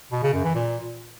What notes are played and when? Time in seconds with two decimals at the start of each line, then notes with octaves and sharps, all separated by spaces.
0.12 B2
0.23 C#3
0.33 F#2
0.44 E3
0.55 A#2